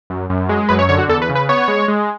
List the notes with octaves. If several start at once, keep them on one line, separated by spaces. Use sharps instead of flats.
F#2
F#2
G#3
F#2 B4
C#5
D3 C#5
F#4
E2 A4
B4
C#3
B4
B3 C#5
G#3
G#3